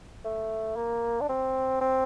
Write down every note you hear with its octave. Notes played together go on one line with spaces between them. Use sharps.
A3
A#3
D4
C4
C4